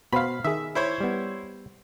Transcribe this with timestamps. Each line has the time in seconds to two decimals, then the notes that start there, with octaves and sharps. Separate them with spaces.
0.13 B2 B3 C5 F5 B5
0.44 D#3 G#4 E5
0.75 E4 C5 C#5
1.01 G3 B3